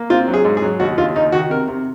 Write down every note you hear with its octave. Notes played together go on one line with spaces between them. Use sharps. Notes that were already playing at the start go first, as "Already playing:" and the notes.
Already playing: A#3
C4 F4
F#3
G#4
G#2
G#4
F#3
D#2 F#4
D#2 F4
D#2 D#4
D#3 F#4
C3 A#4
C3